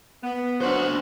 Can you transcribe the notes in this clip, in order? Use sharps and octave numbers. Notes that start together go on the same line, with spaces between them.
B3
F#3 D4 F#4 C5